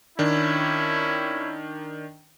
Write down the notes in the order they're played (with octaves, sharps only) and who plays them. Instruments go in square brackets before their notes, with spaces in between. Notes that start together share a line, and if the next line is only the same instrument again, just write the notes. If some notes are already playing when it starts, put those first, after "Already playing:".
[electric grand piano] D#3 D4 [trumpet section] C#4 E4